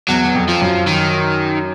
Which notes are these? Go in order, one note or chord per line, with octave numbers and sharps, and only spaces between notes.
E2 F#3
E2
F2
F3
F#2
D#3